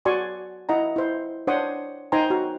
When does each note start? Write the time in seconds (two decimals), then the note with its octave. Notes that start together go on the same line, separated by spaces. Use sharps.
0.05 F#4 D5 G#5 C6 C#6
0.69 E4 D#5 F#5 A#5
0.96 E4 C5
1.47 D4 C5 C#5 F#5 C6 D#6
2.12 D#4 C5 G5 G#5 A#5 C6
2.30 F#4